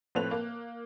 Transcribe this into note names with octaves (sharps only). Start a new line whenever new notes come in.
A2 F3 C4 B4 F#6 F7
A#3